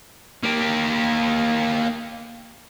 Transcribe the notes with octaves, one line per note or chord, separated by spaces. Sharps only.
A#3 G4